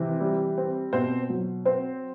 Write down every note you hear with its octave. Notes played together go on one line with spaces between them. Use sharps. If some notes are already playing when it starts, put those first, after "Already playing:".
Already playing: C3 E3
G3
C4
B2 C4 C5
F#3
C4 C5